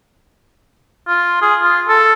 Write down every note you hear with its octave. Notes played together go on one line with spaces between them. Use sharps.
F4
G#4
F4
A4